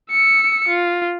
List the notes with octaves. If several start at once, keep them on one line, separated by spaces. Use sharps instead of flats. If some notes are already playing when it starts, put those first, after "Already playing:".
E6 C#7
F4